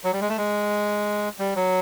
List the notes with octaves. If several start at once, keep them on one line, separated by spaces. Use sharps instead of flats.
F#3
G3
G#3
A3
G#3
G3
F#3